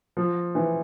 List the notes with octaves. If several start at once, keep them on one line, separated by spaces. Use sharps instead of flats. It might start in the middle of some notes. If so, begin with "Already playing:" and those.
F3
E3